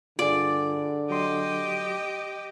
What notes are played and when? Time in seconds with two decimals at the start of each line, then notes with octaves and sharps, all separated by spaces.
0.19 G2 D3 F4 G#4 D5
1.10 F#3 G4 D#5 C6